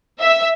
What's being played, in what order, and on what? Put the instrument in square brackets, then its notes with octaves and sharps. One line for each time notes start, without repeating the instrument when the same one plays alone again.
[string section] E5